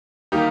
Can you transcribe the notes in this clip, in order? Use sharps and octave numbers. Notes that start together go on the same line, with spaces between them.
D#3 G3 A#3 D#4 G4